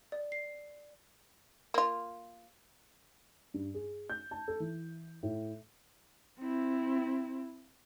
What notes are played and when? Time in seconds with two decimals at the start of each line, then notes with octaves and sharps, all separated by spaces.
0.12 D5
0.32 C7
1.74 A#3 F4
3.54 G2
3.74 G#4
4.10 G6
4.31 A5
4.48 A4
4.60 E3
5.23 A2
6.40 C4 E4